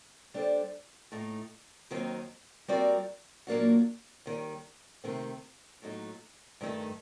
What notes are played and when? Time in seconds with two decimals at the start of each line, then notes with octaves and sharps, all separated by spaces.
0.34 G3 D4 A4 C5
1.12 A2 A3 D#4
1.91 D#2 D#3 F#3 C4 D#4
2.68 G3 C4 F#4 A#4 D5
3.47 A#2 F#3 A#3 D4 F#4
4.26 D#2 D#3 G3
5.04 C3 D#3 A3 C4
5.82 A2 F#3 A3 D#4
6.61 G2 D#3 A3 D#4 A4